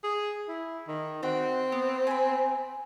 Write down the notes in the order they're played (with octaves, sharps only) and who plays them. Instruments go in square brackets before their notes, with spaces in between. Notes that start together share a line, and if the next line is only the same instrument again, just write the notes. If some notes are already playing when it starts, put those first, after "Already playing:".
[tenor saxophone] G#4
E4
D#3
[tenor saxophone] C4 [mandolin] F#4 G5
[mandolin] B3
G#5 B5